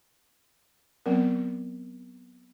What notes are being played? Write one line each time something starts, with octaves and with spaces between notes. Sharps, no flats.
F#3 B3 C4 A#4